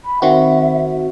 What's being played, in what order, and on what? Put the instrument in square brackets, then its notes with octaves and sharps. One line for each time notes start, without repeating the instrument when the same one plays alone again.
[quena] B5
[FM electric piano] D#3 C4 F#4 [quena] E5